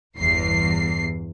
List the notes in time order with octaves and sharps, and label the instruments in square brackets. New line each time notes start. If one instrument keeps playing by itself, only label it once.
[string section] G1 E2 C7